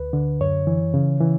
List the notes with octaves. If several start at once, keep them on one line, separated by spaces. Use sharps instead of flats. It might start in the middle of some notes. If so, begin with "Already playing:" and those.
Already playing: D2 B4
D3
F#2 C#5
E3
C#3
E3